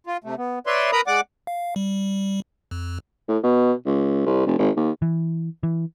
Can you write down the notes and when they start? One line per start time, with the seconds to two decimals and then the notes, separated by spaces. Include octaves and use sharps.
0.07 F4
0.24 C3 A3
0.38 B3
0.66 B4 C#5 D5 E5 C6
0.92 A#4 B4 A#5 B5 D#6
1.07 G#3 D5 F#5 D6
1.47 F5
1.76 G3
2.71 F2
3.29 A2
3.43 B2
3.86 C#2
4.26 C2
4.46 F1
4.59 G#1
4.77 D#2
5.02 E3
5.63 E3